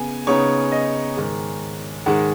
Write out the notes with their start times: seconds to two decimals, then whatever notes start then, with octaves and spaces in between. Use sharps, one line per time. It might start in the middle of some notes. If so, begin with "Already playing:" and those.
Already playing: C#3 B3 G#5
0.27 C#3 B3 D#4 C#5
0.72 D#5
1.17 G#2 D#3 G#3
2.06 G#2 D#3 G#3 F#5